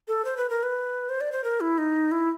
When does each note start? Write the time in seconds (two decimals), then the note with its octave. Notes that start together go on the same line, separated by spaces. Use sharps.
0.08 A4
0.25 C5
0.37 B4
0.50 A#4
0.63 B4
1.09 C5
1.21 D5
1.32 C5
1.44 A#4
1.61 E4
1.78 D#4
2.12 E4